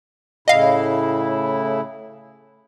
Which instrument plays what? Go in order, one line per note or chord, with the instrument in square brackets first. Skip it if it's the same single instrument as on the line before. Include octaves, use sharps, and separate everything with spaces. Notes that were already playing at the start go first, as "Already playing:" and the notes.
[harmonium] A2 C#3 E4 [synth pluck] D#5 F5